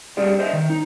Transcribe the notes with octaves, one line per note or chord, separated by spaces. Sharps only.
G3 D4 G4 G#4 D5
C5 D#5 E5
D#3
D#4